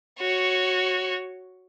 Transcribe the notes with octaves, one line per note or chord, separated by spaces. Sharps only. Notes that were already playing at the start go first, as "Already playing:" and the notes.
F#4 C#5